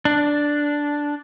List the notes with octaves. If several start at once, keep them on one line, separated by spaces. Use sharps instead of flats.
D4